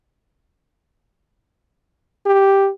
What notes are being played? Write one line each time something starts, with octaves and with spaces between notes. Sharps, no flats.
G4